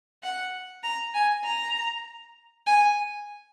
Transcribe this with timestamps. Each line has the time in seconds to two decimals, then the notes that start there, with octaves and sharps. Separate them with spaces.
0.23 F#5
0.83 A#5
1.14 G#5
1.45 A#5
2.66 G#5